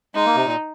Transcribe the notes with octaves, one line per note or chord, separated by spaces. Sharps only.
G#3 D#4
A#3
C3
A#2